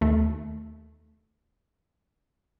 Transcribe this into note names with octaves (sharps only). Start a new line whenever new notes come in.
D#2 A3